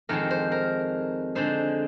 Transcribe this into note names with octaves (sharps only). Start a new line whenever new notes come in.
F2 D#3 G#3 C4 A#4
C5
A#4
D3 G#3 D#4 C5